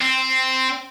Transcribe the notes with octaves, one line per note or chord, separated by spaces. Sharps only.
C4